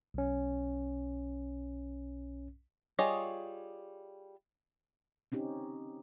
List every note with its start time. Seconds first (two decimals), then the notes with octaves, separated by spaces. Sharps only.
0.14 B1 C#4
2.99 G3 F4 G#4 C#5 D#5
5.32 C4 C#4 D#4 G4